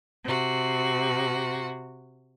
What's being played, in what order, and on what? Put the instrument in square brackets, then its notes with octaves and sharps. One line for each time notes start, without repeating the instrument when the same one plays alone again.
[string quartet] C3 F#4